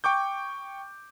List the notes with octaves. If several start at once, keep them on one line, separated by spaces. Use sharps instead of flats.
G5 C#6 D6 G6